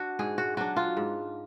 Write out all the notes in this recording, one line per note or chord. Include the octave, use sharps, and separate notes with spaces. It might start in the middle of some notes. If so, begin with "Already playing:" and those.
Already playing: D4 F#4
G#2 G#4
F#4
F#3 D4 F#4
F4
G#2